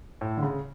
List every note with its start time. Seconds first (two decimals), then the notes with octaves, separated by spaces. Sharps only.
0.21 A2
0.37 D3
0.43 C#3